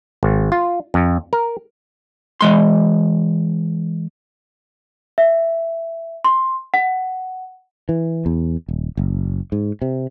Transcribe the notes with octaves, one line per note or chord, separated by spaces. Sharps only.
G#1
F4
F2
A#4
E3 G#3 C6
E5
C6
F#5
E3
E2
D#1
F#1
G#2
C3